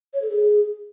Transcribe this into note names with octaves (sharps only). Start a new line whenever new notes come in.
C#5
A4
G#4